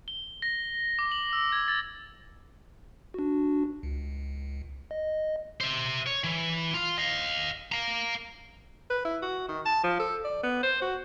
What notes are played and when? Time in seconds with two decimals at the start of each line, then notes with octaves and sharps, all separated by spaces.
0.08 G7
0.42 A#6
0.99 D6
1.12 F#7
1.33 E6
1.52 G#6
1.68 A6
3.14 D4 F#4
3.83 C#2
4.91 D#5
5.61 C5 E5
6.07 C#5
6.24 E3
6.74 F4 F5
6.98 D#5 F5
7.72 F5 A#5
8.90 B4
9.05 E4
9.22 F#4
9.48 D#3
9.66 A5
9.84 F3
10.00 A4
10.25 D5
10.43 B3
10.63 C5
10.82 F#4